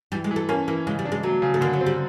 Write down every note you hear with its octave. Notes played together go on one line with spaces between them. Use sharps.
E3 G3
G#3
E3
A3
A#3 C#4
E3 A#3
C#3 G#3
G3
D4
G#3
F#3 A3
C#3
A3
D3 A#3
F#3
C4
G3